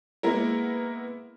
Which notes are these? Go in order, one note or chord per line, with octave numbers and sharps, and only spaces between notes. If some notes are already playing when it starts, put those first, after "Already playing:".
G#3 A#3 B3 E4 A#4